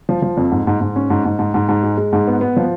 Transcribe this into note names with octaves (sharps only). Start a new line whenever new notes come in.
F3
F3
F2
G#2
G#2
G#2
C#4
G#2
G#2
G#2
G#2
G#2
G#3
G#3
G#2
B3
B3
F3